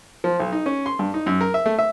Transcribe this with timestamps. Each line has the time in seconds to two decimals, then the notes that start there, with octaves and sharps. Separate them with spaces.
0.24 F3
0.40 B1
0.53 D#4
0.66 C#4
0.86 C6
0.99 G2
1.14 D#4
1.26 F#2
1.41 A#4
1.54 E5
1.66 A3
1.79 E5